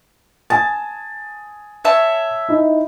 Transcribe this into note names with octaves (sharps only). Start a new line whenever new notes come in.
G#5 A5 D#6 A6
C#5 E5 A5
D#4 E4